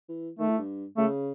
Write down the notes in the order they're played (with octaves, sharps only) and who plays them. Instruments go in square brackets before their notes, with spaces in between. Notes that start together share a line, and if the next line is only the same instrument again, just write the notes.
[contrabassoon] E3
[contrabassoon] D#3 [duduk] A3
[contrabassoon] A2
G2
[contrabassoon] C#3 [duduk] A3